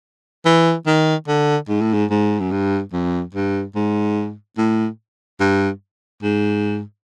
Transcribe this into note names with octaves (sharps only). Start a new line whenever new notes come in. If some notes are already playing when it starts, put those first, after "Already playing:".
E3
D#3
D3
G#2
A2
G#2
G#2
F#2
G2
F2
G2
G#2
A2
G2
G#2